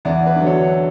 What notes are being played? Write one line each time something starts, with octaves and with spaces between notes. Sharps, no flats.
E2 D5 F#5
B4 D5
D3 F#3
A4 C#5